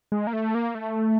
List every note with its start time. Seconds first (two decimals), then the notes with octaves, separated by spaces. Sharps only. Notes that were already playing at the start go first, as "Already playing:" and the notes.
0.12 G#3
0.27 A#3
0.33 A3
0.55 A#3
0.75 A3